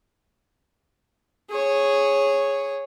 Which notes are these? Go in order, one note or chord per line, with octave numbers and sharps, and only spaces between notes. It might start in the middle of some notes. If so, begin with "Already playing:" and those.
G#4 C#5